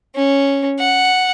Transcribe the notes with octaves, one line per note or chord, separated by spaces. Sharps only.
C#4
F#5